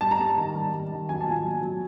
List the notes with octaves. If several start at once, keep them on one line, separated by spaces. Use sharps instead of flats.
G3 A5
A#5
G3 A5
D#3
G3
G3
D#3
F#3 G#5
A5
A#2 G#5
F#3
F#3